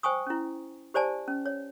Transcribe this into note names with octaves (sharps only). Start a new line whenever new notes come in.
C5 G5 G#5 C#6 D#6
C#4 E4
G4 C5 D5 G#5 A5
C#4
C#5